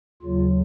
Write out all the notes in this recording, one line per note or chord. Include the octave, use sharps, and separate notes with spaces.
D#2 C#3 F#3 F4